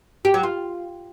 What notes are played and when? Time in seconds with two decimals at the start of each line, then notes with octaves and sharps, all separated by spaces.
0.25 G4
0.34 F#3
0.43 F4